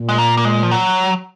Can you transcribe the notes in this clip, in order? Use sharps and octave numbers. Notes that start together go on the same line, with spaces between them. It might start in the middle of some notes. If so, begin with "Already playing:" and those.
Already playing: A#2
G#3
A#3
A#3
G#3
F3
F#3